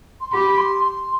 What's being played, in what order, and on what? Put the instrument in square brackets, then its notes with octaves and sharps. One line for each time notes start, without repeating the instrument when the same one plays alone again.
[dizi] C6
[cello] G4 [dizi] B5
[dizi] C6
C6